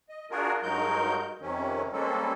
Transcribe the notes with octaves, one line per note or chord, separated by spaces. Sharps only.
D#5
D4 F4 F#4 G#4 A#4
G2 F#3 G#3 D#4 A#4 G6
F2 C3 D#3 C#4
G3 G#3 A#3 C4 C#4 A4